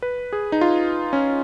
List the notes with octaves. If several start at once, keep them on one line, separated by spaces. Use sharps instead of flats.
B4
G#4
D#4
F4
C#4